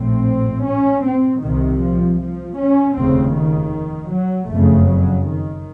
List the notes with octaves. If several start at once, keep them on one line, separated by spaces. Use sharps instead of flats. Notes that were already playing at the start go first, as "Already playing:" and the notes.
Already playing: A#1 A2 C4
C#4
C4
C2 C3 D#3
F3
F3
C#4
F1 D#2 C#3 C4
D#3
F#3
F#1 F2 C#3 A3
F#3
D#3